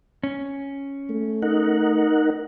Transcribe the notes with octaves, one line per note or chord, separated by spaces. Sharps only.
C#4
A3
D#4 A#4 F#5